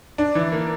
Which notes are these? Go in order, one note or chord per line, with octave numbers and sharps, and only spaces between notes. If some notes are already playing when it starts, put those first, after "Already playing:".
D4
E3
A#3